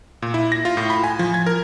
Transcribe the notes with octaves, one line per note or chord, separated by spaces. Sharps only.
A#2
E4
A#6
F4
A2
B5
G#5
F3
G#6
A#4